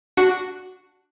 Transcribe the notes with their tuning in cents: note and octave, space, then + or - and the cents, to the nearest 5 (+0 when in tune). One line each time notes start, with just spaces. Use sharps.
D4 +0 F#4 +0